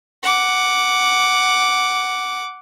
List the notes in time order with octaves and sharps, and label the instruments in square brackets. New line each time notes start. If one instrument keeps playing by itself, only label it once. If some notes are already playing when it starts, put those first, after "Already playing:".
[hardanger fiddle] F#5 D6